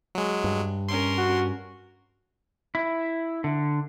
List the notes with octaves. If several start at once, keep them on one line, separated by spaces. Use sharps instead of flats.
F#3 G#3
G2
C#4 A#4 C6
F#4
E4
D3